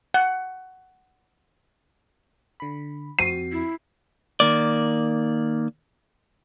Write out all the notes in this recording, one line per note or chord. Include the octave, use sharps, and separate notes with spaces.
F#5
D3 B5
F2 C4 F#4 C7 D#7
E4
D#3 A#3 D5